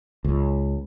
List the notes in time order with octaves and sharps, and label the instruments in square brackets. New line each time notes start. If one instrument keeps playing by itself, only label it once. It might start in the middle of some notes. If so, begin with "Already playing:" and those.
[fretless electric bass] C#2